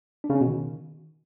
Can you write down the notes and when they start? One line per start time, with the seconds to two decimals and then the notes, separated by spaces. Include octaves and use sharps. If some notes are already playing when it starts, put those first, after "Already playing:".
0.24 D4
0.30 C#3
0.35 C#4
0.41 B2
0.46 D#3